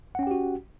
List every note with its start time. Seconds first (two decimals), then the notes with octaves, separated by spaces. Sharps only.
0.15 F#5
0.19 C#4
0.23 G5
0.27 G4
0.31 F#4